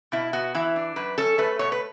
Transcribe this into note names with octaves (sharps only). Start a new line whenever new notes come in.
B2 E4
B3 F#4
E3 E4
D4
F#2 B4
C#4 A4
A3 B4
B2 C#5
B4